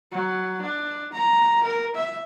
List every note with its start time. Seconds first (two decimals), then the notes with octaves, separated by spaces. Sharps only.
0.12 F#3
0.62 D4
1.13 A#5
1.64 A#4
1.95 E5